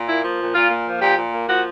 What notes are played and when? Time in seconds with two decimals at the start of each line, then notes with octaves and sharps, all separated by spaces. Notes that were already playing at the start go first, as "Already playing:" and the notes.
Already playing: A#2
0.08 A#3 E4
0.24 F3
0.40 A#2
0.55 A#2 F4
0.71 A#3
0.86 F3
1.02 A#2 G4
1.17 A#2
1.33 A#3
1.48 F3 F#4